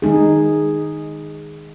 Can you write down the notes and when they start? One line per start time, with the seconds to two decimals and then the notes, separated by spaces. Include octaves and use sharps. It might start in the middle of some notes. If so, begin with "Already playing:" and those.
0.02 D#3 G#3 D#4 G#4